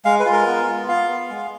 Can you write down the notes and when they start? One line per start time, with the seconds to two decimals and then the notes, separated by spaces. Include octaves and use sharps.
0.05 G#3 F5
0.20 B4
0.26 F4
0.32 A#4
0.47 B3
0.67 F4
0.88 F4 F5
1.09 B3
1.30 G#3